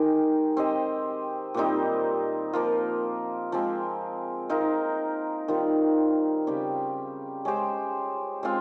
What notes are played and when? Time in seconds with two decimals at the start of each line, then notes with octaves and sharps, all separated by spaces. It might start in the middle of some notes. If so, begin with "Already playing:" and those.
Already playing: D#3 G#3 D#4 G4
0.57 C4 G4 C5 D#5
1.54 A#2 G3 C4 D#4
2.53 F3 A#3 F4
3.52 F3 G#3 C4
4.49 C4 D#4 A#4 F5
5.48 D#3 G3 C4 F4
6.47 C#3 G3 C4 G4
7.45 G#3 C#4 G4 C5
8.43 G#3 C4 F4